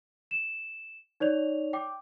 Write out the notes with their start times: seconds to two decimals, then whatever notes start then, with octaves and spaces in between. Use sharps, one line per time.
0.31 E7
1.20 D#4 C#5 D5 F7
1.73 G5 D6